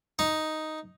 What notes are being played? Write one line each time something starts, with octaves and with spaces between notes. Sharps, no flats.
D#4